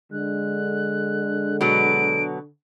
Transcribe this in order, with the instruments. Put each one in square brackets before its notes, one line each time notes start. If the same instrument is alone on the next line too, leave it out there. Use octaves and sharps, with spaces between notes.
[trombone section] D3 [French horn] G#3 [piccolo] F#6
[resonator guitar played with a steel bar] B2 F#3 B3 [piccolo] D7